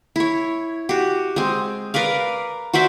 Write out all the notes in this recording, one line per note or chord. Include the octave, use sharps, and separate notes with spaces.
E4 C#5
F#4 G4
G#3 C4
A#4 B4 D5 F5
F#4 C5 D5 E5